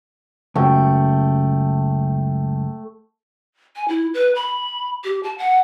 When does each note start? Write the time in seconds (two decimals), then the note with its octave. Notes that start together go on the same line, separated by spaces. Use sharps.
0.56 C#2 F#2 A3 G5
3.76 G#5
3.88 E4
4.14 B4
4.35 B5
5.04 G4
5.23 A5
5.38 F#5